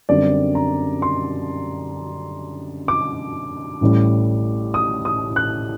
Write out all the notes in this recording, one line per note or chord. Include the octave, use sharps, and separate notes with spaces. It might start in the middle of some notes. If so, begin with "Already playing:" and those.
F#2 D3 G3 C4 D5
A#5
C6
D6
A1 A2 G3
D#6
D#6
F#6